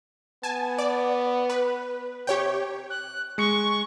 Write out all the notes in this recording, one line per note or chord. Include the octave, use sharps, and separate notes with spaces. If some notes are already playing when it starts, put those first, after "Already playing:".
B3 G#5 A5
D5
B4
C3 G4 C#5 G5
F#6
G#3 C#6 C#7